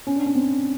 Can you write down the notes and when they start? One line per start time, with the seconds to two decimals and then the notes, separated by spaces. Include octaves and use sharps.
0.07 C#4
0.16 D4
0.26 C#4
0.35 C4